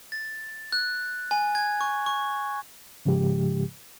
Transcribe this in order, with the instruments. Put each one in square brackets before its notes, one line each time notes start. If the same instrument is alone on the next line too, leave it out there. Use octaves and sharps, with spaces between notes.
[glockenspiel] A6
F#6
G#5
G#6
C#6
C#6
[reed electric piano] G#2 C#3 F3 G#3 G4